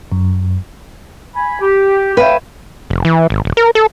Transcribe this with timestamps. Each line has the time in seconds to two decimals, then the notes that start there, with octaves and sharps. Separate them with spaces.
0.12 F#2
1.35 G#5 B5
1.61 G4
2.17 B4 C#5 E5 F5 G5
2.90 F1
3.05 E3
3.30 G#1
3.45 D#1
3.57 A#4
3.75 A4